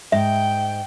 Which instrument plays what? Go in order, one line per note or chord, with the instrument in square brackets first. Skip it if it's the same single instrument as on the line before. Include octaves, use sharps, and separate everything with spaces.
[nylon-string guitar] G#2 [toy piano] E5 [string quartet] G5